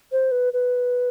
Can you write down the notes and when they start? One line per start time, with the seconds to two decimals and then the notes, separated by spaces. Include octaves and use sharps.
0.12 C5
0.31 B4
0.53 B4